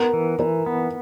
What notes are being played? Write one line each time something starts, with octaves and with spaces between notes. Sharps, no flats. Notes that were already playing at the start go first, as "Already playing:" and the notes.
Already playing: B3 A#4
E3
E3 A#4
B3